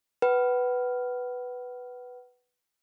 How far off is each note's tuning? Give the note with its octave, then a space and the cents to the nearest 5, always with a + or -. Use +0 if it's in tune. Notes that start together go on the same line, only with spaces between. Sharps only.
B4 +0 F#5 +35